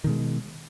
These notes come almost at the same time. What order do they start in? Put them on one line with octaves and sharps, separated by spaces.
D#3 B2 G#3